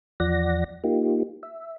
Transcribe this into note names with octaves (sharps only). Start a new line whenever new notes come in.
E2 F3 D5 F#5 A#6
A#3 D#4 F4 G4
E5